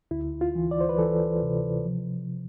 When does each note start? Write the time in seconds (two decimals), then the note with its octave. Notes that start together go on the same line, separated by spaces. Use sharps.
0.11 D2 E4
0.41 F4
0.55 E3
0.71 D5
0.81 C5
0.89 B4
0.98 E3 A4
1.42 C3
1.85 F3